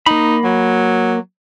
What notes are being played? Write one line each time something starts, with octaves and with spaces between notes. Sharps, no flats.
A#3 D#4 B5
F#3